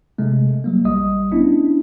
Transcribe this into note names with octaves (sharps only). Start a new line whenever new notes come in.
C3 G#3 A3
F#3 G3 A#3
A1 G3 D#5 D#6
B3 C#4 D4 E4